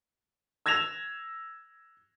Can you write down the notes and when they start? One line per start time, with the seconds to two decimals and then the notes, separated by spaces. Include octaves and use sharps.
0.66 E6 G#6 A#6 E7 F7